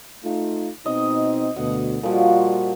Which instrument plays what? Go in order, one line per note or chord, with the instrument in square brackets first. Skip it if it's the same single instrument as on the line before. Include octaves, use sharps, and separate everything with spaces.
[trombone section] A3 D#4 F4
[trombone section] B2 C4 D#4 [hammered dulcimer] D#5
[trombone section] D2 B2 [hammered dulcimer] F#5
[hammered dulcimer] A#2 F3 [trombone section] G3 F4 F#4